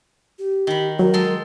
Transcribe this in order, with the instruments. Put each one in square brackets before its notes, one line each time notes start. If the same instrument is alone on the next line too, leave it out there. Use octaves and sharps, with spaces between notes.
[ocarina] G4
[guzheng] D#3 B5
[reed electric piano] F#3 [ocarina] A#4
[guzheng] G#3 A4 C6